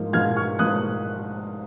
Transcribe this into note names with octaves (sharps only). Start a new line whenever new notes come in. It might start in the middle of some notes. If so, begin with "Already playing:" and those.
Already playing: G#2 F3 A#3
G#2 F3 A#3 F6 G#6
C#6 F6
G#2 F3 A#3 D#6 F#6